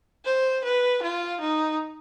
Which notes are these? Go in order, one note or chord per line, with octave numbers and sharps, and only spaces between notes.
C5
B4
F4
D#4